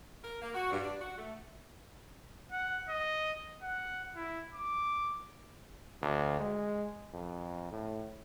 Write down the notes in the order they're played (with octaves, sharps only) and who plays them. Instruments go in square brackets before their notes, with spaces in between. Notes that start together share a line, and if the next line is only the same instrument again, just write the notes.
[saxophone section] A#4
A#3
F#4
G2
D4
F#4
A3
[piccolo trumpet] F#5
D#5
F#5
E4
D6
[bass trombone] D2
G#3
F2
A2